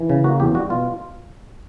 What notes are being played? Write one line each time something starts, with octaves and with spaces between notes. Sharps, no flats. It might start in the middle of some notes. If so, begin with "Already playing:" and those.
Already playing: E3
C#3
A#3 F#4
E2 G4
G3 F#4
B2 F4